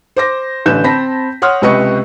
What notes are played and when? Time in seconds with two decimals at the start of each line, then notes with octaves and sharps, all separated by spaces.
0.17 C5 D6 A#6
0.66 A1 D3 B4 G6 E7
0.84 C4 A5 B5 A#6 B6
1.42 C#5 F#5 C6 D#6 F6
1.62 C#2 C3 B4 D#5 C#6 C#7